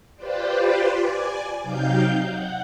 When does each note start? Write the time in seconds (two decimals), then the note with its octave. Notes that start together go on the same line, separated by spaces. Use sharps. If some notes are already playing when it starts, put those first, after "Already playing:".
0.15 F4 G4 B4 C5 D5
0.96 D5 G#5
1.62 C3 F#3 D#4 F5 G5 G6
2.25 F#5